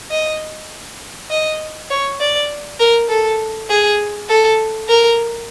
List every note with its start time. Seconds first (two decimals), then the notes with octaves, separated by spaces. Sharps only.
0.11 D#5
1.31 D#5
1.90 C#5
2.20 D5
2.80 A#4
3.09 A4
3.69 G#4
4.29 A4
4.89 A#4